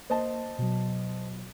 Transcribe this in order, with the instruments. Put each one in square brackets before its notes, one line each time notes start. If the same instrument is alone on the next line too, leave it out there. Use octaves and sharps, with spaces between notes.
[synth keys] A#3 [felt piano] C5 D#5 A5
[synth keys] B2 F#3